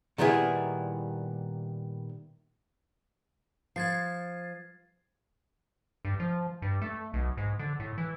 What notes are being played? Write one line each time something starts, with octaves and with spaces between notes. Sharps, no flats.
A#2 D#3 G3 B3 E4 G#4
F3 G#6 A6 C7
G2
F3
G2
A3
B1
G#2
D3
A2
E3